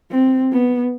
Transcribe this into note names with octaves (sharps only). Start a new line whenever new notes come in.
C4
B3